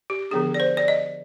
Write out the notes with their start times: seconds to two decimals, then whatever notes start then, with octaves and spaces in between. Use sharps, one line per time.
0.10 G4
0.31 D3 F3 B3 D4 G#4
0.54 D5
0.60 C5
0.77 D5
0.88 D#5